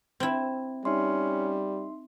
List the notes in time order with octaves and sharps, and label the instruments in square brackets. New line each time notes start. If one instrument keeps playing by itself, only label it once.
[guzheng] C4 E4
[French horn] G3 [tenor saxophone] C#4 [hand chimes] D#4 E5 C6